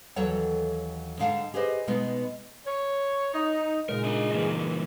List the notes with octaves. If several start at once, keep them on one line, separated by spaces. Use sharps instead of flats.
D#2 E3 F#3 A4 C#5 F#5
G#2 D3 F5 F#5 A5
G4 G#4 B4 C5 D#5
B2 G#3 B3 D#4
C#5
D#4
A#2 C#3 G#3 D#4 A#4
D4 D#5
G2 A#2 E3 A#3